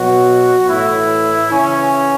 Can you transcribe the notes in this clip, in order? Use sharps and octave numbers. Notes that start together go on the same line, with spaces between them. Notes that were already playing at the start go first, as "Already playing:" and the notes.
Already playing: B2 F#3 F#4
A2 E3 E4
C#3 E3 C#4